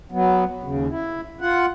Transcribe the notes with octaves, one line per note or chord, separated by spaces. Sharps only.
F#3 B3
D#2 C#3
E4
F4 F#5